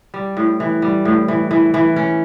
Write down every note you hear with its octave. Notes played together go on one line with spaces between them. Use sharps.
G3
A2
E3
G3
A2
E3
E3
E3
C#4